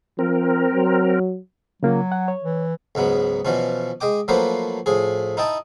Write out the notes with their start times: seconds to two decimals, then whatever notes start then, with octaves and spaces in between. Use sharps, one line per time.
0.19 F3 C4 A#4
0.73 F#3
1.83 C#3 F#3 A#3 F4
2.12 F#5
2.28 C#5
2.44 E3
2.95 C#2 G#2 F#3 B3
3.45 B2 E3 F3 C#4
4.01 G#3 D#5 G5 D6
4.28 F3 F#3 A3 A#3 B4 C5
4.86 A2 F3 G#4
5.37 D#4 E4 D#5 G5 A5